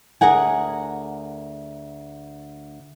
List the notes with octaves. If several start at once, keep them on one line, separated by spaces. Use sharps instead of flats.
D2 G2 G#4 A#4 F#5 G#5